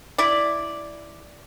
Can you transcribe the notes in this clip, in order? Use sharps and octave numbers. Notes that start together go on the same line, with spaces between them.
E4 D5